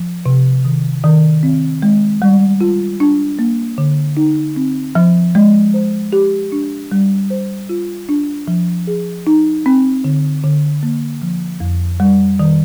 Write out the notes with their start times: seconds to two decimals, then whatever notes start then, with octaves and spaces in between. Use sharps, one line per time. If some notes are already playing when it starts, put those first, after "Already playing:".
Already playing: F3
0.26 C3
0.65 D#3
1.04 D#3
1.43 C4
1.82 G#3
2.22 G3
2.61 F4
3.00 D4
3.39 A#3
3.78 D3
4.17 D#4
4.56 C4
4.95 F3
5.35 G#3
5.74 C5
6.13 G4
6.52 D4
6.92 G3
7.30 C5
7.69 F4
8.09 D4
8.48 F3
8.87 G#4
9.27 D#4
9.66 C4
10.04 D3
10.44 D3
10.83 A#3
11.22 F3
11.60 F2
12.00 G3
12.39 D#3